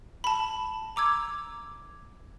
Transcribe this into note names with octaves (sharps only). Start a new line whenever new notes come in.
A5 B5
A#5 D6 E6 G#6